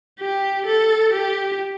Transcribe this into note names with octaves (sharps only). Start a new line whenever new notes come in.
G4
A4
G4